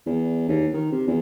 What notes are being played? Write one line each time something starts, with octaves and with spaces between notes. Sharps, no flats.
E2
D#2
D#3
C3
E2